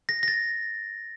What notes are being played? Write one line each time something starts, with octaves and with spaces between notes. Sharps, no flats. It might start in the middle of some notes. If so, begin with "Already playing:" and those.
A#6
A#6
A6